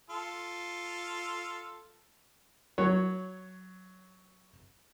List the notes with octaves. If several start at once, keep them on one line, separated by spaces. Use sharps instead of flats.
F4 A4
F#3 C#5